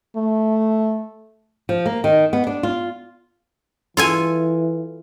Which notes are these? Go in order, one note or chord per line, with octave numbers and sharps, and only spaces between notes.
A3
F3
A#3
D#3
B3
D4
F4
E3 F4 A4 G#5